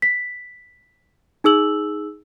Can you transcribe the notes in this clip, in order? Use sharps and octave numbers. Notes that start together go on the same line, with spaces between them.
B6
D#4 G#4 E6 F#7